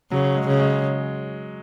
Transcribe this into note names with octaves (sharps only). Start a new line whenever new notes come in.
C#3 F#3
G#3
C#3
G#3